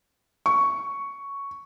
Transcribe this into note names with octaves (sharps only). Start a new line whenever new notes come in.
C#6